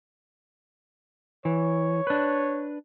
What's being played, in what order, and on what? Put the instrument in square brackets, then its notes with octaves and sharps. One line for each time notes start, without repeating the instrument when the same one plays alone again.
[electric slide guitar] E3 [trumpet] C#5
[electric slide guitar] D4 B4